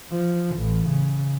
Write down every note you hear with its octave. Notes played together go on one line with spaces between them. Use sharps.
F3
A1
C#3